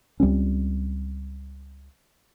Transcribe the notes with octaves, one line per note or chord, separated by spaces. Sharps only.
C#2 G3 C4 C#4